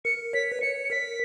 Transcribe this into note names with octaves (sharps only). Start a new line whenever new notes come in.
A#4 C#7
C#5 B6
B4
C#5 C#7
C#7
A#4 B6